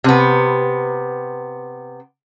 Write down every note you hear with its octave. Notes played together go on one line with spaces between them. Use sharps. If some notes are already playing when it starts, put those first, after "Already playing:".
C3 B3